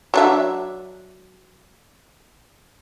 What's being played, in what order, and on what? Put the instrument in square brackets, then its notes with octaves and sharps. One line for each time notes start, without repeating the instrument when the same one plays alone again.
[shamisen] F#3 D4 E5